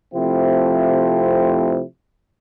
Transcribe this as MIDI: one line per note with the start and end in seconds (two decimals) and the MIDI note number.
0.14 1.82 48
0.14 1.82 53
0.14 1.82 57
0.14 1.82 60
0.14 1.82 64